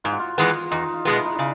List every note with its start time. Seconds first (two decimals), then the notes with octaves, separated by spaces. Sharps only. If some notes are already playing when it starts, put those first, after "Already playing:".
0.04 G#2 F4
0.12 F#4
0.20 F4
0.38 E3 G#3 B3 F4
0.71 E2 D#4
0.94 F4
1.05 B2 G#3 B3
1.16 E4
1.25 D#4
1.35 C#3 D4